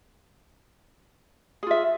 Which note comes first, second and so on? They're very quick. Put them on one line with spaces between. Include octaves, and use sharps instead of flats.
G#4 F4 E5